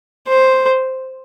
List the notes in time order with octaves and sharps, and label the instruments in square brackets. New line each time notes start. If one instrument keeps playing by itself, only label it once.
[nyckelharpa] C5